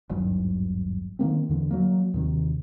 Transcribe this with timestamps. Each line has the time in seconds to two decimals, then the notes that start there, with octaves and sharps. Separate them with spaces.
0.09 D#1 G#1 G2 F#3
1.19 D#3 F#3 A#3 C4
1.49 E2 D3 E3
1.71 F#3 A#3
2.14 D#2 C3 D#3